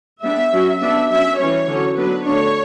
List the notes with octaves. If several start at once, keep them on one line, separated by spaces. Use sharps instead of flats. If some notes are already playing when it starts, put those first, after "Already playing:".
G3 B3 D4 E5
F#3 C#4
G3 B3 D4 E5
F#3 C#4 E5
E3 G3 C#4 C#5
D3 F#3 C#4
F#3 B3 D4 B4
D3 A3 D4 C#5